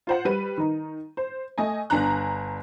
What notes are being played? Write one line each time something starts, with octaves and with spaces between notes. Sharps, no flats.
F4 C5 F#5
G3 B4 D#7
D#3 D#4
C5
A3 D#5 G#5
G1 D4 G#5 A#5 F#6